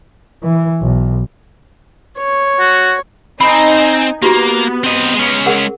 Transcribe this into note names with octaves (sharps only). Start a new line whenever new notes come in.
E3
B1
C#5
F#4
C4 D#4 G#5 B5
A#3 B3 E4 F#4 G4
C4 D#5
G#3 C#4
G#4 A#4 F#5